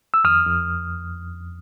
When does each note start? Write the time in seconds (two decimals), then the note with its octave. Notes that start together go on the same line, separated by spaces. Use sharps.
0.14 E6
0.24 F2 D#6 F6
0.46 F2